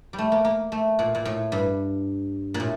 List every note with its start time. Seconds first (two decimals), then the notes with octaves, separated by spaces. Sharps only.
0.13 G3
0.18 A3
0.32 A#3
0.45 A#3
0.72 A3
0.99 A#2
1.15 A#2
1.25 A2
1.52 G2
2.54 A#2
2.60 A2